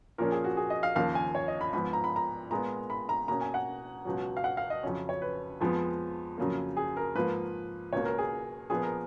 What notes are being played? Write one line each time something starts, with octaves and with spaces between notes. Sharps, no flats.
A#2 F3 A#3 C#4 A#4
G#4
F#4
G#4
D#5
F5
D#2 C#3 F3 A#3 F5
G#5
C#5
D#5
B5
G#2 F3 B3 B5
A#5
B5
A#5
A#2 G#3 B3 A#5
B5
A#5
B2 A#3 C#4 A#5
G#5
F#5
C#2 B2 F#3
F5
F#5
F5
D#5
F2 C#3 F#3 C#4
C#5
B4
F2 F3 G#3 B3
F2 C#3 F#3 A#3
G#4
A#4
G#2 F3 A#3 B4
C#2 B2 A#3 C#5
A#4
G#4
A#2 F3 B3 G#4
A#4